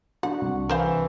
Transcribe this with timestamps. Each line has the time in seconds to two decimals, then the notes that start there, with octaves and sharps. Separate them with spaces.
0.23 D4 F#4 F#5
0.42 C2
0.69 E3 A#4 C5 F5